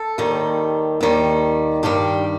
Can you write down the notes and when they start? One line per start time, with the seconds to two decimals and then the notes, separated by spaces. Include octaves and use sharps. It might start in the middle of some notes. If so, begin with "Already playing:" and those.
Already playing: A4
0.18 D#2 D#3 G3
1.01 D#2 D#3 G3
1.83 G2 D#3 G3 G4